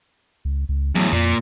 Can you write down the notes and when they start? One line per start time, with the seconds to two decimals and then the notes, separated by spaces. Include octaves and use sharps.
0.45 C#2
0.69 C#2
0.95 E2 A2 F#3
1.12 F2 A#2